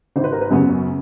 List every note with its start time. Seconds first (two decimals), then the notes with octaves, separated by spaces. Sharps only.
0.16 G#1 C5
0.24 B4
0.33 A#4
0.41 B4
0.51 F#2 C#3 F#3 B3